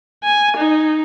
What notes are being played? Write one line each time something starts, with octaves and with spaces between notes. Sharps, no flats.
G#5
D#4